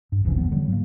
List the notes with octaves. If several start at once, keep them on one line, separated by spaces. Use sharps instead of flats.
G2
E1 C2 E3 C#4
F#3 B3
D3 F#3 G3
G#2 F#3 A#3